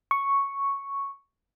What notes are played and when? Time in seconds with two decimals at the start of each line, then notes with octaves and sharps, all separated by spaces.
0.11 C#6